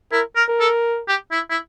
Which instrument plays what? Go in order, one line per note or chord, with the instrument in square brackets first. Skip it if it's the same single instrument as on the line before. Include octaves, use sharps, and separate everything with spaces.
[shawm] E4 [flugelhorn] A#4
[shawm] A#4
[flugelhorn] A#4
[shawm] A4
G4
E4
E4